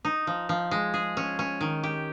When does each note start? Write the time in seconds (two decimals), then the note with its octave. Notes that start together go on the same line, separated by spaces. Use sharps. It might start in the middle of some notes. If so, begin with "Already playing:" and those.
0.05 D#4
0.27 F3
0.49 F3
0.71 G#3
0.94 G#4
1.17 C#4
1.39 C#4
1.61 D#3
1.83 G4